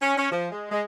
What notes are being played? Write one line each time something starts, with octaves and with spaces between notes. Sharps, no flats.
C#4
C#4
F3
G#3
G#3